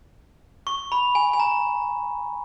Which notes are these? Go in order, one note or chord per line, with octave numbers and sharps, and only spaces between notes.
C#6
B5
G#5
G#5
A#5